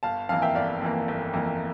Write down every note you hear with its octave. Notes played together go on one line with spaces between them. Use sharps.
G1 F5 A5
F2 E3 A#3 F5 A5
E5 G5
G1 D5 F5
F2 E3 A#3
G1
F2 E3 A#3